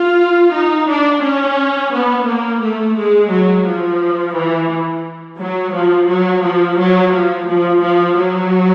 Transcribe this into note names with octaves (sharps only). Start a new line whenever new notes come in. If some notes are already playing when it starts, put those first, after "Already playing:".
Already playing: F4
D#4
D4
C#4
B3
A#3
A3
G#3
F#3
F3
E3
F#3
F3
F#3
F3
F#3
F3
F3
F3
F#3